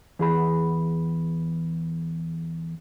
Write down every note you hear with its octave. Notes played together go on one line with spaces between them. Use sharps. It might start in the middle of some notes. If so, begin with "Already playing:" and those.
E2 G#4 B5